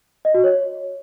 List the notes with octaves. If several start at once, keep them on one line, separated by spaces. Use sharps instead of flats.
D#5
F#4
C#5